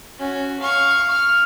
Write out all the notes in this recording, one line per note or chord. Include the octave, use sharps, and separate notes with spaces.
C#4 F#4
F5 C#6
F6